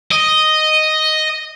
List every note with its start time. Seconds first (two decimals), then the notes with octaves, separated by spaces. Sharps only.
0.11 D#5